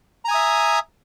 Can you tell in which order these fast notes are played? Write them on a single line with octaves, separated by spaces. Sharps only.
A#5 G#5 D#6 E5